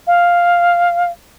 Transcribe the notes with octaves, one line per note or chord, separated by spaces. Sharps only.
F5